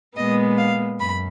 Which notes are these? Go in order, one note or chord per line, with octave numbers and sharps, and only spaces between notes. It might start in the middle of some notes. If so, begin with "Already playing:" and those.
A#2 G#3 B3 D#5
F5
F#2 B5